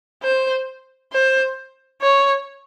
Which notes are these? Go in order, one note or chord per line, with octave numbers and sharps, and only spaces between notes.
C5
C5
C#5